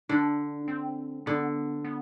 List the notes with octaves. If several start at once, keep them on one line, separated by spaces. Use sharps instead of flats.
D3 D4
C4
D3 B3
B3